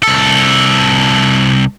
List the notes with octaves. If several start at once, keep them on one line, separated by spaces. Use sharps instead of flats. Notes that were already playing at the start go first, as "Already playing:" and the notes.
C2 A4